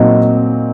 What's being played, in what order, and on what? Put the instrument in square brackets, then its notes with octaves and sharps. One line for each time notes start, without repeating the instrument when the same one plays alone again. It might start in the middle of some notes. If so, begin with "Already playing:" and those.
Already playing: [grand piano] A#2 F#3 C4 D#4